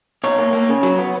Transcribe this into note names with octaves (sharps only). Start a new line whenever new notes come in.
B2 C#5
A#3
A#3
C#3
F#3
B3